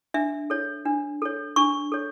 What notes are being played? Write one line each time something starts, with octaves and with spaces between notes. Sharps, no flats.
D4 E5
A4 C#5
D4
A4 C#5
D4 C#6
A4 C#5